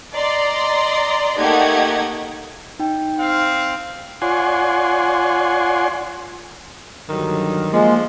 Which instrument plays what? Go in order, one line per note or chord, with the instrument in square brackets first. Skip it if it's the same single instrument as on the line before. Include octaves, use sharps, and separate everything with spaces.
[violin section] D5 D#5 A#5 C6
A3 A#3 D#4 G4 F#5 G#6
[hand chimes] D#4 G5
[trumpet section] C4 F5
[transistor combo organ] F4 C#5 D5 F#5 G#5 C6
[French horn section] G2 D3 F#3 [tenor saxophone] D#3
[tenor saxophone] F3 [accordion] G#3 [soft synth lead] A#3